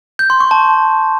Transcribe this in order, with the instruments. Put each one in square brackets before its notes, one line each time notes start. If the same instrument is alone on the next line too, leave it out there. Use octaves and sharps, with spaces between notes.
[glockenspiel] G6
C6
C#6
A5